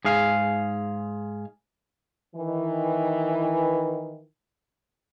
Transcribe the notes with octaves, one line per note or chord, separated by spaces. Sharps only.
G#2 G#4 F5
D#3 E3